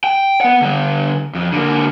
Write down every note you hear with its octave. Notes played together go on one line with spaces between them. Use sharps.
G5
B3 F#5
D3 G3
F2
D3 A#3